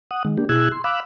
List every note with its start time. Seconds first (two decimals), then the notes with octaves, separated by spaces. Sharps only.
0.11 F#5 D#6
0.25 D#3 G#3
0.38 A#3 D4 G4
0.49 B2 E4 G#4 E6 F#6 G#6
0.72 C6
0.84 F5 B5 D6 E6 F#6